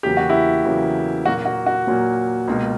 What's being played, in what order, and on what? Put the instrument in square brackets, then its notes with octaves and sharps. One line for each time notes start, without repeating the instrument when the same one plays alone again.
[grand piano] E2 C#3 F#3 A#3 G4
F#4
E4 G4
E2 C#3 F#3 A#3
A#2 F#3 A#3 F#4
F#4
F#4
A#2 F#3 A#3
C#2 B2 A#3